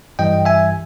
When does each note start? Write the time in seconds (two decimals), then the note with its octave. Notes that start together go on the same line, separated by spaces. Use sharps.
0.19 G2 E3 G3 D#5 G5
0.45 E5 G#5